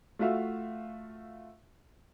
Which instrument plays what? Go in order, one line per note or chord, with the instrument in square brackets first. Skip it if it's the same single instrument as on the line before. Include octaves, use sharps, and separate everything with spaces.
[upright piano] A3 F4 F#4 E5 F5